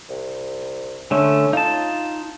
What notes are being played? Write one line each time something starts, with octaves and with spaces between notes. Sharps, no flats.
C2
D3 A3 C#4
D#4 F4 A5